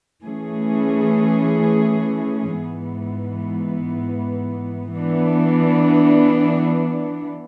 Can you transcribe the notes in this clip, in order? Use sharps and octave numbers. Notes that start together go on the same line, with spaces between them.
E3 A3 C#4 G#4
G#2 E3 B3
E3 B3 D4